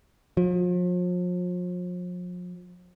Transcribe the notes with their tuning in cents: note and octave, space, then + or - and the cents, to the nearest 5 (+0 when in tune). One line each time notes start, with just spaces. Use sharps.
F3 +40